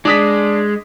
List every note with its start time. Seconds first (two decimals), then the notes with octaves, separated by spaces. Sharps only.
0.05 G#3 D4 D#6 B6